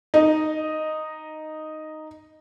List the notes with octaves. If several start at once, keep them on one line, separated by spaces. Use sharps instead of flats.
D#4 D#5